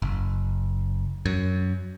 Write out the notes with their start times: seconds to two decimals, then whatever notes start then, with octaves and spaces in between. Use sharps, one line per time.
0.02 F#1
1.26 F#2